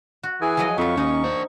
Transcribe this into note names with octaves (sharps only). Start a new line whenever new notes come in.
F#4
E3 G#4 G#5
F3 F#3 D#5
F2 E4 F4 C#6
D#2 C#4 D#4
D4 C5